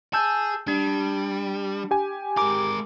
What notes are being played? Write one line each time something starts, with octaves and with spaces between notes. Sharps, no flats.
G#4 A5 E6 G6
G3 D4
G4 G#5
G#3 A#4 D6